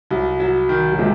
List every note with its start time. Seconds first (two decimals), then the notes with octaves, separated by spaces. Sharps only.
0.11 C2 F#3
0.40 F#3
0.69 D#3
0.92 F#3
0.99 C3 G#3